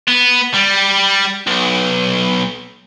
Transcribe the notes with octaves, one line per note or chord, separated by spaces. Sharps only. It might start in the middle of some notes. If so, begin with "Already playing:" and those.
B3
G3
B1